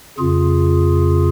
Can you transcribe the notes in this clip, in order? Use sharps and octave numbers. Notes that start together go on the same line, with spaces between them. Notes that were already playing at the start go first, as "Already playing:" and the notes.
F2 C#3 F4 G#4